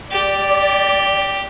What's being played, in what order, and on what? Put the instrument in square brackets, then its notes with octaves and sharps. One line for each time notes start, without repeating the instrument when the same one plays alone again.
[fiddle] G4 [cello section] D5